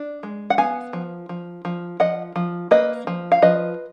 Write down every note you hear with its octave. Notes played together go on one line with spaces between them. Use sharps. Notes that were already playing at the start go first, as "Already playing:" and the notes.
Already playing: D4
G#3
F#5
B3 F5 G#5
F3
F3
F3
F3 D#5 F#5
F3
A#3 B4 D#5
F3
F5
F3 B4 D#5